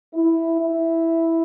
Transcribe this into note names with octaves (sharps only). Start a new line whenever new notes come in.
E4
E4